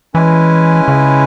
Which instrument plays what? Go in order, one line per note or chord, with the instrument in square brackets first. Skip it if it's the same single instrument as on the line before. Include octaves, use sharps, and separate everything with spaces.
[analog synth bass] E3 [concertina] G#3 C#4 E4 B4 G#5
[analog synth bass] C#3